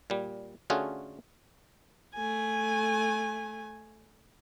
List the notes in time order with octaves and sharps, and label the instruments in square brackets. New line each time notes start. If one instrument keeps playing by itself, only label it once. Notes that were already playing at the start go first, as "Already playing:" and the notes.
[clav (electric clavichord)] A#2 G3
D3 A3 C#4 F4 F#4 G#4
[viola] A3 G#5